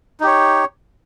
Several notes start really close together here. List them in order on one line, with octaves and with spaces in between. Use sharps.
D#4 G4 C#5